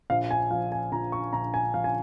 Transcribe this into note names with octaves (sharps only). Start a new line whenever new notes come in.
A#1 F5
G#5
F3 F5
G#5
A#1 A#5
C#6
A#1 A#5
G#5
F3 F5
G#5